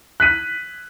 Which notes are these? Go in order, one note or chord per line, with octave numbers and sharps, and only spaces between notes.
F#6 B6 D#7